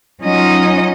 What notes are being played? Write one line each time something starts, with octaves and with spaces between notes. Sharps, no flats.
F#3 C#4 D#4 F4 D#5 F#5